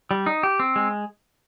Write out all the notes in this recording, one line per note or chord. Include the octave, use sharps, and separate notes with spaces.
G3
D#4
G4
C4
G#3